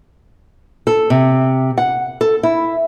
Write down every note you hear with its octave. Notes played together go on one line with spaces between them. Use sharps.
A4
C3
F#5
A4
E4